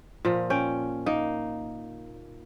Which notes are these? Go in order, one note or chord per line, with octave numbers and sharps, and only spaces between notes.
A#2 F3
C#4 G5
A#3 D#4